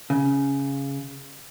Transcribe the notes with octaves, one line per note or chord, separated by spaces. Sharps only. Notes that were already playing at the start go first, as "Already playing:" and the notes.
C#3